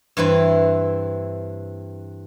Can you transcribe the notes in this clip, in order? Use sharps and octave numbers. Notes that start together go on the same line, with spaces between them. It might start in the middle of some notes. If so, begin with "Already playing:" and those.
G2 E3 C4 E4